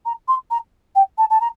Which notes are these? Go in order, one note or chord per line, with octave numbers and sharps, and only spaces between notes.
A#5
C6
A#5
G5
A5
A5
A#5